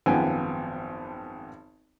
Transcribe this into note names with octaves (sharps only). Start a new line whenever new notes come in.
G#1 F#2 F3 B3 G5 G#5